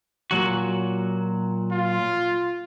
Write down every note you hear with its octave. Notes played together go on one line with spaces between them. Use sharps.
A#2 F#3 F#4
F4